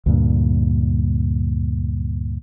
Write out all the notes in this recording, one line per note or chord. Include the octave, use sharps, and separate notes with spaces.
D2 G2 A#2